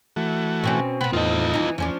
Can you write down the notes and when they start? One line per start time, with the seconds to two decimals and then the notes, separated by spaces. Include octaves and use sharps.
0.16 E3 A3 F#4
0.64 B2 C4 C#4
1.01 B2 B3 C4 F#5 B5
1.13 E2 A2 D#4 F4 D#5
1.54 E3 D#4
1.78 E2 F3 C#4 D4